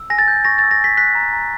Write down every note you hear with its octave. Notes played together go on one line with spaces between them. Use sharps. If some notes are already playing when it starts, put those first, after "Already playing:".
Already playing: E6
G#5 A#6
A6
G6
C#6 A#6
E6 A6
A#6
G#5 B6
F#6 B6
A#5
A#5